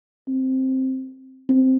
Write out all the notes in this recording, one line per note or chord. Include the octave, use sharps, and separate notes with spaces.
C4
C4